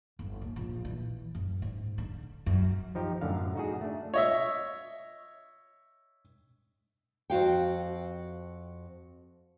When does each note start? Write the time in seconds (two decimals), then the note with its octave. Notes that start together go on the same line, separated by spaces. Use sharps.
0.19 G1
0.41 D#2
0.56 A#1
0.85 E3
1.35 F#2
1.62 G#2
1.98 D3
2.46 F#2
2.95 F3 D#4 G4
3.21 F#2 A2 D3 F5
3.55 D#4 F#4 G#4
3.81 A3 D4
4.14 C#5 D#5 E5
7.30 F2 F#4 F5 G5